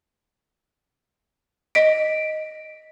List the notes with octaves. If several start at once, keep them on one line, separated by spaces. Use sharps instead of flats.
D#5 B6 D7